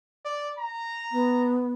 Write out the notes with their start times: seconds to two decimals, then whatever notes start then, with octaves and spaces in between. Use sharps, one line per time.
0.25 D5
0.58 A#5
1.12 B3